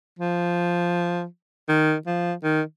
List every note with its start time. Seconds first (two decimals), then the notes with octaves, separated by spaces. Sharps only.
0.19 F3
1.68 D#3
2.06 F3
2.43 D#3